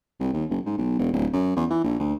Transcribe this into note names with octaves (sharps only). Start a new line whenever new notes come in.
C2
D#2
F#1
G#2
B1
E1
D1
F#2
E2
E3
A#1
D2